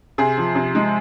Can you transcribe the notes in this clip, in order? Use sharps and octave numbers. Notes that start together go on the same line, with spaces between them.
C3 G#4
F3
C3
G#3